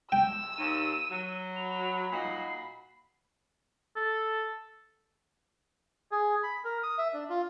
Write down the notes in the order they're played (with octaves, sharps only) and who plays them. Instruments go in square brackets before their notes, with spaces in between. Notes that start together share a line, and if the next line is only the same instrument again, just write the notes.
[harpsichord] G5 [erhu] E6
[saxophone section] D#2 [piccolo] D#7
[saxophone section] F#3
[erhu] B5 [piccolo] F7
[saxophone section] A#2 D#4 F#4 [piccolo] C7
[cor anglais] A4
[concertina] G#4
B5
A#4
D#6
E5
D4
F4